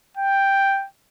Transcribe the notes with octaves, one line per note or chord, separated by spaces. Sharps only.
G5